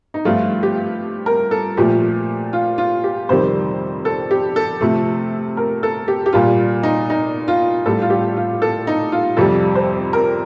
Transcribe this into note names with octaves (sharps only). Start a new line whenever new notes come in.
D#4
G2 F3 A3 F4
G4
A#4
A4
A#2 F3 A3 G4
F4
F4
G4
F2 C3 D#3 G3 C5
A4
G4
A4
C3 F3 A3
A#4
A4
G4
G4
A#2 G3 F4
D#4
D#4
F4
A2 G3 A4
F4
G4
F4
A4
D#4
F4
F2 C3 G3 A4
C5
A#4